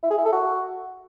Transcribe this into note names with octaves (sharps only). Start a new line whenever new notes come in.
E4
G#4
E4
A4
F#4